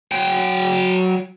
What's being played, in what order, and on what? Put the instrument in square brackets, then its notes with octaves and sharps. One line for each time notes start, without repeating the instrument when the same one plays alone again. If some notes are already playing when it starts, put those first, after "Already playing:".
[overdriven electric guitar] F#3 G5